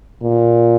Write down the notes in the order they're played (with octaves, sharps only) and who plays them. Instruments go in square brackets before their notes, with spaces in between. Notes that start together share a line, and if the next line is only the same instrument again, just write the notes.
[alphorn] A#2